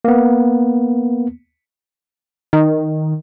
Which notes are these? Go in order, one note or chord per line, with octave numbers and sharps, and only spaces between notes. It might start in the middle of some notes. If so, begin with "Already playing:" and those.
A#3 B3
D#3